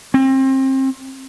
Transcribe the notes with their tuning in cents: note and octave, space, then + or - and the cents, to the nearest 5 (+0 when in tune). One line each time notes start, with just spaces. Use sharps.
C4 +30